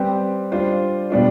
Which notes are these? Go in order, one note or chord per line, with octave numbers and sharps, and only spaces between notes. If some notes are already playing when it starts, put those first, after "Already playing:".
Already playing: G3 C4 G4 B4
G3 D4 F4 C5
B2 G3 B3 D4 F4